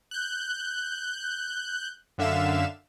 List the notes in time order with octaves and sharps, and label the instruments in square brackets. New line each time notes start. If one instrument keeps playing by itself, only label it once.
[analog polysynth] F#6 G6
F#2 D3 E5 F5 E7